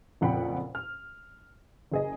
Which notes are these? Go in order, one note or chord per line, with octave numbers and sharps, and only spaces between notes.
F#1 F2 A#2 F#5 G5 B5
F6
F#1 G#4 D#5